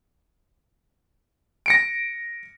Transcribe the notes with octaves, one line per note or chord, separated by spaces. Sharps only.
A#6 C#7 D7